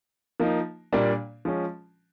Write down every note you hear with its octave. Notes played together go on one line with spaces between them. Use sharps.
F3 A#3 D#4
A#2 G3 A#3 D4
F3 G#3 C#4